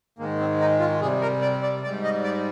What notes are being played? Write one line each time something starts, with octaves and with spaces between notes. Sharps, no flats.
G#2 D#3 G#3 A#3
C4
D#4
F4
C3 G3 G#4
A#4
D5
D5
G#2 G3 D5
D#5
D5